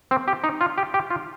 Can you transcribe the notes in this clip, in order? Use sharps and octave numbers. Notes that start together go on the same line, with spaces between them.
C4
G4
D#4
F4
G4
G4
F4